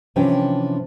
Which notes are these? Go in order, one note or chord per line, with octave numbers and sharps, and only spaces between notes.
C3 E3 F3 C#4 D4 G5